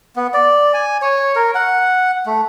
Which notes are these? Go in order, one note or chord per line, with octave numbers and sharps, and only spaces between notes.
B3
D5
G#5
C#5
A#4
F#5
A3